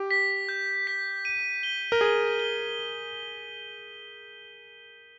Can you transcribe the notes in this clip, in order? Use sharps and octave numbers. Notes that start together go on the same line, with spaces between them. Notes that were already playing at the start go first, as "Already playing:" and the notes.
Already playing: G4
B6
G6
B6
D#7
G7
A#4
G#4 G7
G7